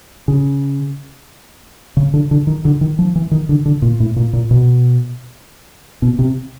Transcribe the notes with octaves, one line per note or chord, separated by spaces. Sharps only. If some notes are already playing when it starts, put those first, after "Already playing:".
C#3
C#3
D3
D3
D#3
D3
D#3
F3
E3
D#3
D3
D3
A#2
A2
A#2
A#2
B2
B2
C3